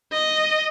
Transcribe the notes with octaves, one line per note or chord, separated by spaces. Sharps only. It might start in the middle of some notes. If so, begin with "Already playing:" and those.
D#5